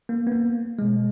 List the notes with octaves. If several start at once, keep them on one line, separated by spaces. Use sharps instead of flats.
A#3
B3
A#3
B2 G#3